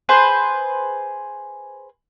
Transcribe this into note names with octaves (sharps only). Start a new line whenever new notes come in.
G#4 B4 C5